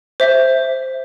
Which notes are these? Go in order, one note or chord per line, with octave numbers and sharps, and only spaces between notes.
C5 E5